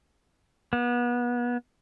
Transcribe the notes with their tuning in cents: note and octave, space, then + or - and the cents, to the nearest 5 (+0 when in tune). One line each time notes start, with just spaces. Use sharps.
B3 -30